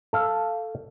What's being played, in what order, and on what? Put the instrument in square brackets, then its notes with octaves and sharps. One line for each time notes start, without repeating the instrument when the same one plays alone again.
[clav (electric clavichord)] A4 F5